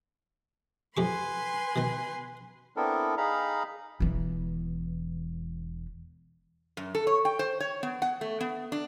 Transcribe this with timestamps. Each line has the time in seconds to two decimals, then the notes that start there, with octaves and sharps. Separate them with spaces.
0.97 F2 G4 B4 G#5 C6 C#6
1.76 B2 D#3
2.76 B3 C4 D4 E4 A4 A#4
3.18 D#4 G#4 F5 A#5 B5
4.00 E1 E3
6.77 F#2
6.95 A4
7.07 C#5
7.25 G5
7.39 C5
7.60 C#5
7.83 B3
8.02 F#5
8.21 A3
8.41 B3
8.72 D4